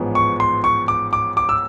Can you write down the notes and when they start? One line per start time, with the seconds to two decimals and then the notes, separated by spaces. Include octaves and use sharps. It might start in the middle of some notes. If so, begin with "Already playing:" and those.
Already playing: A1 G#2 F3 G#3 B3
0.15 C#6
0.40 C6
0.64 C#6
0.88 D6
1.13 D6
1.37 D6
1.49 E6